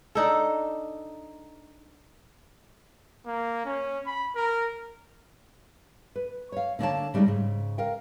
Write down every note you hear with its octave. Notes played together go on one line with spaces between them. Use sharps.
D4 D#4 A4
A#3
C#4
B5
A#4
B4
C#5 F5
D3 A#3 D4 C#5 F5 A5
C#3 G3 G#3 D4 D#4
G#2 C#3
A#4 F5 G5